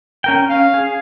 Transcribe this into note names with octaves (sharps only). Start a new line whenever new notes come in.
C#4 A#4 G5
C#4 F5
G#4